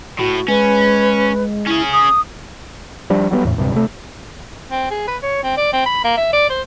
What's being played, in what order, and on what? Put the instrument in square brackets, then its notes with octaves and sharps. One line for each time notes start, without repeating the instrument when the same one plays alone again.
[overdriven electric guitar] A2 [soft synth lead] F#4
[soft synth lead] G#3 [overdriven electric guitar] C#4 [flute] B4
[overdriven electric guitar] C#4 G#4 [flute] E4
[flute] D#6
[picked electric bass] F3 G3 D4
F#3 G3 A#3 B3
E2 A2
D1 G2 C3
C3 A3
[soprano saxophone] C4
G#4
B4
C#5
C4
D5
C4
B5
A#3
E5
D5
C5